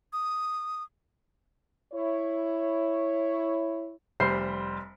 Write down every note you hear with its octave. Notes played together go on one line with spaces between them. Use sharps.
D#6
E4 C#5
F1 G3 C5 B5 C7